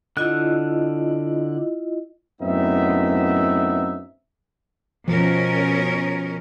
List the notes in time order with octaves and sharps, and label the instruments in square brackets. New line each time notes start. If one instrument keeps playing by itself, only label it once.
[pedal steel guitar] D3 F#6 [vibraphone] E4 F4 D#5
[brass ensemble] F#2 A2 B3 C4 D#4 E5
[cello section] B2 C#4 A#4 [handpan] F3